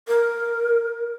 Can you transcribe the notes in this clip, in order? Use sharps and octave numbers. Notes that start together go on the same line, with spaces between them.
A#4